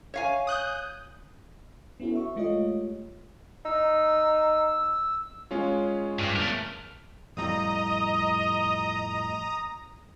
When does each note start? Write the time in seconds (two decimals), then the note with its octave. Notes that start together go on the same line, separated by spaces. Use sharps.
0.14 C#5 F5 G#5
0.47 D#6 F#6 G6
2.00 B3 C#4 E4 F#4 A4
2.15 E5 C#6
2.36 G#3 A3 F4 G4 C#5 D#5
3.65 D#4 E6
5.51 G#3 C#4 F4
6.19 G2
6.36 A3 A#4
7.37 F2 A2 G3 D#5 A#5 D#6